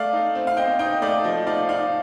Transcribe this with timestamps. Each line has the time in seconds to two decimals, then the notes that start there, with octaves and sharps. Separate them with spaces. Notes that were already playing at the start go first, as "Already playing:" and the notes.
Already playing: A3 D5 F5
0.13 D#4
0.35 C4
0.47 F5
0.57 C4 D#5 G5
0.79 D#4 D#5 G5
1.02 A3 D5 F5
1.24 F3 D#5
1.47 D#4 D5 F5
1.69 D#4 D5 F5